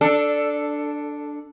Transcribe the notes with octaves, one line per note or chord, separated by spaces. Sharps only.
D4 A4